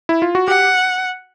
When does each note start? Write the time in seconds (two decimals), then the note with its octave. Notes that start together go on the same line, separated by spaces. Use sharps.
0.09 E4
0.22 F4
0.35 F#4
0.48 G4 F#5